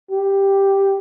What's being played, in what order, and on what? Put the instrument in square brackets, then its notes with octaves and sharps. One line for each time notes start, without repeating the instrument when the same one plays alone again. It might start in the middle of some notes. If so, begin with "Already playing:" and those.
[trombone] G4